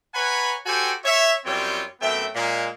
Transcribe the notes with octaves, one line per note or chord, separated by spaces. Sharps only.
B4 C#5 F#5 G#5 A#5 B5
F#4 G4 A4 C5 G5 G#5
C#5 E5
F#2 G3 C4 F4 C#5 G5
F#2 A3 B3 C4 E5 G5
A#2 G#3 A#3